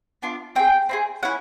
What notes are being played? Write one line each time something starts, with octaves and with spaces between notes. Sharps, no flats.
B3 D4 F4
C4 E4 G#4 G5
C4 E4 G#4
C#4 E4 F#5